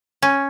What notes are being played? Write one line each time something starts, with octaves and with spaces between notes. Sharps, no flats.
C#4